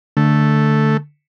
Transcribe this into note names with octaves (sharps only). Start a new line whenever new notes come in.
D3 A3